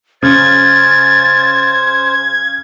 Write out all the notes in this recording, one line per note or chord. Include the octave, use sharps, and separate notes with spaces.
C#3 C5 G#6 A6